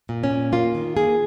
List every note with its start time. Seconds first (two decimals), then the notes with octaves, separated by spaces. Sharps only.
0.09 A#2
0.23 C#4
0.31 A#2
0.53 A#3 F4
0.75 D#3
0.96 A#3 G#4